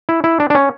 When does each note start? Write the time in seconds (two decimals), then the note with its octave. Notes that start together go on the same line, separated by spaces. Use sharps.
0.09 E4
0.24 E4
0.40 D4
0.50 D4
0.55 C#4